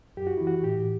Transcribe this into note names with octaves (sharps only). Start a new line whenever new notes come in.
F#2 G4
F#4
E3 E4
F#4
A2 G4